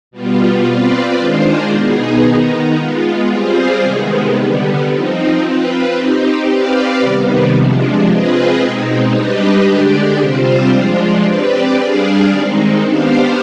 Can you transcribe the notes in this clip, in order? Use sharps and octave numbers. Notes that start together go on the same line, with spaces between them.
B2 G3 B3 F4
C4 F4 B4 D5
D#3 G#3 D4 F4 C5
B2 B3 D#4 G#4
D#3 B3 D#4
G#3 B3 F4
G3 C4 F4 G#4 C5
C3 D#3 G#3 B3
D3 G3 B3
F3 C4 D#4
C4 F4 B4
C4 D#4 G4
C4 G4 B4 D5 F5
C3 D#3 G3 B3
C3 F3 G#3 D4
C4 F4 G#4 B4 D#5
B2 G#3 C4 D#4
G3 D4 G4 B4 D#5
D3 G#3 D4 G4 D5
C3 G3 C4 F4 C5
F3 G#3 D4 F4
C4 G4 B4 D5
G3 D4 G#4 D5 F5
D#3 G#3 C4 D#4
B3 D4 G4 C5 F5